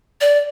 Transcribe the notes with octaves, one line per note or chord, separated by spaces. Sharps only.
D5